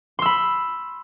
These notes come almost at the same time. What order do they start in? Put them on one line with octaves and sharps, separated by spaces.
C6 E6 B5